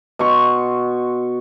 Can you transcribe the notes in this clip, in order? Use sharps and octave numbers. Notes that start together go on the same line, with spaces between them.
B2 C6 C#6